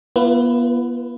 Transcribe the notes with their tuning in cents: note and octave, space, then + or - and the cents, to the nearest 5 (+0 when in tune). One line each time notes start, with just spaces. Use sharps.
B3 -35 F4 -40 B4 +15